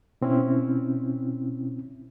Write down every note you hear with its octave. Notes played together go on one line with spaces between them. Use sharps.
B2 C4 C#4 E4